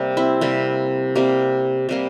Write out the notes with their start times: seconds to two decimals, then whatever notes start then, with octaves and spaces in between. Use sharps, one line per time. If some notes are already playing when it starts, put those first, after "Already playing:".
Already playing: C3 G3 A#3
0.17 C4 E4
0.41 C3 G3 A#3
1.15 C3 G3 A#3
1.89 C3 G3 A#3